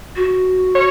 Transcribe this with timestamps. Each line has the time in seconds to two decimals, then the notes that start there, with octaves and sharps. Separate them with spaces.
0.16 F#4
0.75 C#5